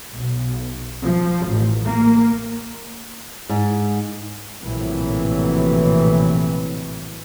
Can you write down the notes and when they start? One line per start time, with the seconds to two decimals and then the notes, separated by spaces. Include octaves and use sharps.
0.13 B1
1.03 F3
1.45 A1
1.85 A#3
3.49 G#2
4.62 A#1 A2 C3 E3 F#3